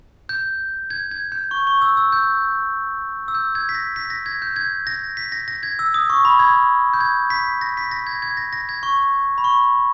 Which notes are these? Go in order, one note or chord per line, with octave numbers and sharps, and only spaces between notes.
G6
G#6
G#6
G6
C#6
C#6
E6
E6
G6
E6
G6
G#6
B6
A#6
B6
A#6
G#6
G6
G#6
A#6
B6
A#6
A#6
G#6
E6
D#6
C#6
B5
G#6
G6
G#6
B6
A#6
B6
A#6
G#6
G#6
A#6
A#6
G#6
C#6
B5
C#6